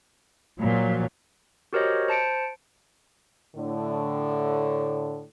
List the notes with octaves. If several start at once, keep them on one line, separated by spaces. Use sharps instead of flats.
A#2 F3 F#3
F#4 G4 A#4 C5 C#5 D#5
C5 A5 C#7 D7
A2 D3